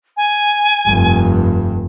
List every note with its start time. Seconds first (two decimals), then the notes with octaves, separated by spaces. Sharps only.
0.17 G#5
0.86 F1 G2